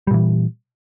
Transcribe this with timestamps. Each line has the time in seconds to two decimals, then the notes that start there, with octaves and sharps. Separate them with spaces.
0.07 G3
0.11 A#2
0.14 E3